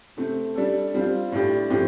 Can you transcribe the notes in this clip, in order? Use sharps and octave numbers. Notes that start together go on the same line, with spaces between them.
C3 A3 C4
G3 D4 A4
G3 C4 F4
A2 G3 D4 G4
A2 F3 C4 G4